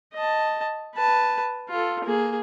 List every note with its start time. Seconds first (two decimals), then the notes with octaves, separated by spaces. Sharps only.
0.13 D#5 A5
0.95 B4 A5
1.69 F4 A4
2.05 A#3 G#4